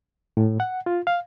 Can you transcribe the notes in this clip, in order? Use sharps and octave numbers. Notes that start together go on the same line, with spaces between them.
A2
F#5
F4
F5